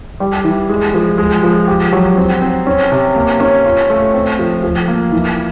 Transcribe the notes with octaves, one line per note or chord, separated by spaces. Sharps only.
G3
E3
G#3
F3
G#3
F3
G4
F#3
C4
C4
C#4
C3
A#3
C#4
F4
A3
C4
F3
F3
A#3
E3